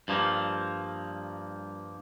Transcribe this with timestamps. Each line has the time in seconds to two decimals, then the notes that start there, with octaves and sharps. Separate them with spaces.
0.08 G2 F3 A#3